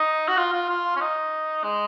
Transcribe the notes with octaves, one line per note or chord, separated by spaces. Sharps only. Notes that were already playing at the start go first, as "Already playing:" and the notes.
Already playing: D#4
F#4
F4
F4
F4
C#4
D#4
G#3